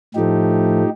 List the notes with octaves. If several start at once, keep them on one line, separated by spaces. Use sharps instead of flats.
A2 F3 A3 D#4 G4